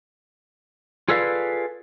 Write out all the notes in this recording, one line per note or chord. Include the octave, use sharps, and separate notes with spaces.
F4 G#4 A4 B4 D5 F5